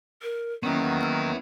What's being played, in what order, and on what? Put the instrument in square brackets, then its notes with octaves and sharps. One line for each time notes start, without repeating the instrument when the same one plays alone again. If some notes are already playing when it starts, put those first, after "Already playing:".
[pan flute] A#4
[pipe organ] D#3 F#3 [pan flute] A#3 [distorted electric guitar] B3 E4 [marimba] C#4
[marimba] E6 F6